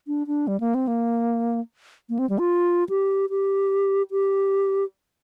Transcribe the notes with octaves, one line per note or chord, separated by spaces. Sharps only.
D4
D4
G3
A#3
C4
A#3
A#3
C4
G3
F4
G4
G4
G4